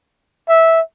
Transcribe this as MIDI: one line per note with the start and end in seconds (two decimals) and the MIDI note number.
0.49 0.81 76